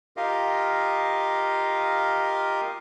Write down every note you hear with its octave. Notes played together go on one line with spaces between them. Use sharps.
F4 G4 A#4 D#5 F5